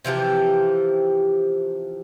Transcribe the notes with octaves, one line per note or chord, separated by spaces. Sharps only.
C3 E3 F3 G4